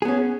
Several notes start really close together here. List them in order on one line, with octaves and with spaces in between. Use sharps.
G#4 B3 C#4